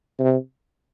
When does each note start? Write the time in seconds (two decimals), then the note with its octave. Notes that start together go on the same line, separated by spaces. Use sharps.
0.19 C3